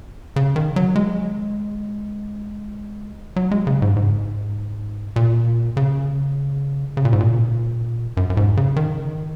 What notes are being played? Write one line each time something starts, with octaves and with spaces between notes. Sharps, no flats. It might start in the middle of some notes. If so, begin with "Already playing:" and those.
C#3
D#3
F#3
G#3
F#3
G#3
C#3
G#2
G#2
A#2
C#3
C#3
A#2
G#2
A#2
F#2
F#2
G#2
C#3
D#3